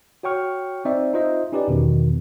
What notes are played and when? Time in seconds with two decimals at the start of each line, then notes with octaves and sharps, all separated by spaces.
0.23 F#4 C#5 G5 C#6 F6
0.85 C4 D#4 C5 D5 E5
1.13 D#4 F4 C5 D#5 E5
1.52 C#4 D#4 G4 B4 D5
1.68 E2 B2 D#3